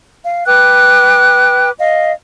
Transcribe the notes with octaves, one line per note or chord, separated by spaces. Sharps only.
F5
B4 G5 D6 F#6
D#5 F5